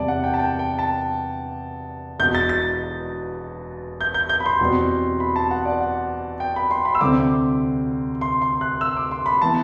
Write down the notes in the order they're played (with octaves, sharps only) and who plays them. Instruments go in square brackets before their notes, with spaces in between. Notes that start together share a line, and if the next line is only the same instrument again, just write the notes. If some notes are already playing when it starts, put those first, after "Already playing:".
Already playing: [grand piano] E2 C3 G3 D5 A5
F#5
G5
A5
G5
G5
A5
E1 E2 B2 G6
A6
A6
G6
G6
G6
B5
C6
E2 B2 G3 C4
B5
A5
F#5
D5
F#5
G5
B5
C6
B5
E6
D2 C3 G3 C4 D6
C6
C6
F#6
E6
D6
C6
B5
E3 B3 A5